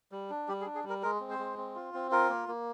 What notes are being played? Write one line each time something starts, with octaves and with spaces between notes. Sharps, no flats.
G3
D4
G3 G4
G#4
D4
G#4
G3
A#4
G#3 A#4
C4
C5
G#3
C4
F4
C4
F4 A#4
A#3
A#3